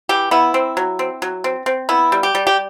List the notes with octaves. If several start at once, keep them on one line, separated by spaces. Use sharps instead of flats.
E3 G4
B3 E4
C4
F#3
C4
F#3
C4
C4
B3 E4
G3
G4
G3
G4